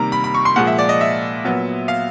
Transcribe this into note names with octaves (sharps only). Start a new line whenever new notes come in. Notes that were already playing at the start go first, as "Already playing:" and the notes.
Already playing: C3 D#3 G3 A#3 A#5
B5
B5
C#6
C6
A#2 F3 G#3 F#5
E5
D5
D#5
E5
A#2 F#3 B3
F5